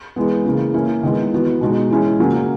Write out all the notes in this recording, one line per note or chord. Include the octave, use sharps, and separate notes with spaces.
E3 G#3 B3
C#3 E3 A#3
E3 A#3 C#4 E4
D#3 G#3 B3 E4
E3 B3 F#4
B2 G#3 D#4 F#4
E3 G#3 C#4 E4
C#3 F#3 A#3 C#4